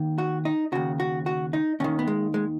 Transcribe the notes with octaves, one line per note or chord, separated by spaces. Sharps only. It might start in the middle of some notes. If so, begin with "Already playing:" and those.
Already playing: D#2 D#3
F#4
D#4
D#2 C#3 F#4
F#4
F#4
D#4
D#2 D#3 C#4
B3
G#3
G#3